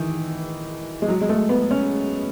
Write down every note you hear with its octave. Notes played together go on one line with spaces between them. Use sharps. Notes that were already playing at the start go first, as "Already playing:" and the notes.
Already playing: D#3 E3
G#3
F#3
G#3
A3
B3
C#4